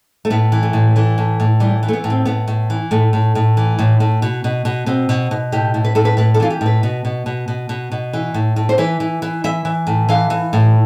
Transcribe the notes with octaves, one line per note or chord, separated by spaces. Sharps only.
A3
A2 B3
E3
A3
A2
E3 A3
A2
A2
E3 G3
E3
A3
B3
A2
C4
A2 B3
A2
E3
A2 A3
A2
A2
E3
A2
A2
B2
B2
B2
B2 C4
B2
B2
A2 G4
A2
B4
A2 A4
B4
A2 B4
A4
E3 F4
G4
A2
B4
B2
B2
B2
B2
B2
B2
E3
A2
A2
C5
E3 B4
E3
E3
E3 E5
E3
A2
E3 F5
E3
A2